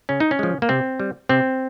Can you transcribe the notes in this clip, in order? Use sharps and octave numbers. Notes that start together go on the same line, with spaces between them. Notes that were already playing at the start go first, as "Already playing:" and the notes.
C#3 C#4
D#4
C#4
F3 G#3
A#3
C3 C4
G3
C3 C4